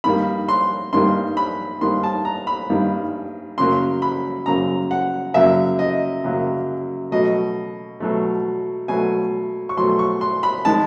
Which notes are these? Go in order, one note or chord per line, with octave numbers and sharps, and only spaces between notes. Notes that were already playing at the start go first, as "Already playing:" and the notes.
G2 D#3 G3 A#3 B5
C6
G2 D#3 G3 A#3 C6
B5
G2 D#3 G3 A#3 C6
A5
A#5
B5
G2 D#3 G3 A#3
F#2 C#3 F#3 A#3 C6
B5
F#2 C#3 F#3 A#3 A#5
F#5
F#2 C#3 F#3 A#3 E5
D#5
F#2 C#3 F#3 A#3
B2 F#3 A3 D#5
B2 F#3 A3
B2 F#3 A3 G#5
C#6
B2 F#3 A3 C6
C#6
C6
B5
D#3 G#3 A5